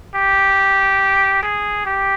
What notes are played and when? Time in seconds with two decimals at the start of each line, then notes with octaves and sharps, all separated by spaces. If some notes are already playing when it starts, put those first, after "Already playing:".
0.15 G4
1.43 G#4
1.85 G4